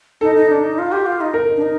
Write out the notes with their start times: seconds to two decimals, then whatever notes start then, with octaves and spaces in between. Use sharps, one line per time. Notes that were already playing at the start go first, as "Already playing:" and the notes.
0.21 D#4 A4
0.35 D#4
0.50 D4
0.64 D#4
0.78 F4
0.92 G4
1.06 F4
1.21 D#4
1.34 A#4
1.56 D4
1.62 D#4